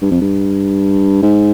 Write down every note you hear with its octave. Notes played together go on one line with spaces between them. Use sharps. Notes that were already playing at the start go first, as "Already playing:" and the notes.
G2
F2
G2
G#2